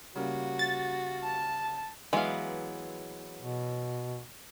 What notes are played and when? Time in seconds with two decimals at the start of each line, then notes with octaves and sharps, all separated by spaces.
0.16 C#3 G3 A#3 F#4
0.59 A6
1.24 A5
2.13 E3 F#3 G#3 B3 F5
3.40 B2